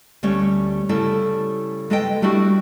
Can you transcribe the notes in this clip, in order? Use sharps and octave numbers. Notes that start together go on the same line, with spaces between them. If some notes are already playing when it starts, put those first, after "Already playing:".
D2 G3 A3 C#4 C#5
C#3 G3 A3 E4 A4
G#3 A3 A4 B4 D#5 G5
G3 A3 D4 E4 F#4